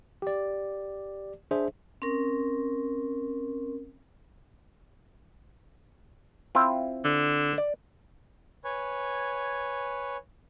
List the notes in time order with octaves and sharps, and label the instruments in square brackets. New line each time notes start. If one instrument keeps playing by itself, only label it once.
[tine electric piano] G4 D5
D4 G#4 C5 E5
[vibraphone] C4 C#4 A#4
[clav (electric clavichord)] C4 E4 F4
[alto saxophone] D3
[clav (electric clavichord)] D5
[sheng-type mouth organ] B4 C#5 G#5